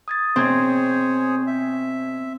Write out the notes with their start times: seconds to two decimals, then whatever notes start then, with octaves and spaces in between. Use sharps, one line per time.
0.08 D#6 G#6 A6
0.36 B2 C4 G#4 C5 C#5 C6 G#6
1.47 E5